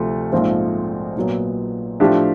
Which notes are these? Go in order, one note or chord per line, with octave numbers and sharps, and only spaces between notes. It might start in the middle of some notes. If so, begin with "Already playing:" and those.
Already playing: D2 C3 F3 A3
A#1 G#2 F3 A3 C4
A#1 A#2 F#3 B3
A2 F3 A3 D4 G4